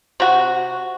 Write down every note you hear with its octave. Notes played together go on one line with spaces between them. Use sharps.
C3 F#4